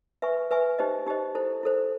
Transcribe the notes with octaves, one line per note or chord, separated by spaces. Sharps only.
B4 E5 G#5 C#6
B4 E5 G#5 C#6
D#4 G4 C5 D#5
D#4 G4 C5 D#5
E4 A4 C5
E4 A4 C5